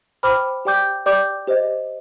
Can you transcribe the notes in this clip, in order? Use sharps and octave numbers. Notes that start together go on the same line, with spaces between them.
C5 G5 B5 D6 F6
G4 D5 G5 D6 G6
G4 D5 G5 D6 G6
G4 C5 D#5